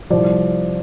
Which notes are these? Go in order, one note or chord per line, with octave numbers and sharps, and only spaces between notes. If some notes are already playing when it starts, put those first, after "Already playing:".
C2 C3 F3 D5